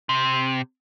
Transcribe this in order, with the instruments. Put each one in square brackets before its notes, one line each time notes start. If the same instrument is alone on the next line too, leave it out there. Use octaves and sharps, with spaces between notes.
[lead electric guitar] C3